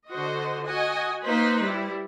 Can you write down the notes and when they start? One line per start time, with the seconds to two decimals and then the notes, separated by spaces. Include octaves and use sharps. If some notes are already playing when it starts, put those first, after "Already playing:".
0.11 D3 F#4 C5 D#5
0.67 F#4 D#5 G#5
1.26 A#3 D#4 B4 C5
1.63 G3 E4